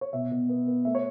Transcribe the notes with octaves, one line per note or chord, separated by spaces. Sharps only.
C#5
B2 E5
B2
B3
B3
A3 E5
C#5